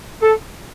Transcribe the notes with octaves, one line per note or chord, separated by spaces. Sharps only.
A4